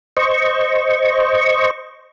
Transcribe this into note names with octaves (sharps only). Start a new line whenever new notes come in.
C5 D#5 C#6